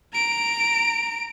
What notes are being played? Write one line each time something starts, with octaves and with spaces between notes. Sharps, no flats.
A#5 D7